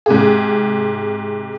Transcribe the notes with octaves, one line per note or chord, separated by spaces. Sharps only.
G#2 C3 G#4